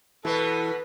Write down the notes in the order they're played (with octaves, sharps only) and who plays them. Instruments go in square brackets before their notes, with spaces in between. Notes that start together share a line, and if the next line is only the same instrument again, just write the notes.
[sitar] B2 B3 [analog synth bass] E3 [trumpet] A4 [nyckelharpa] B4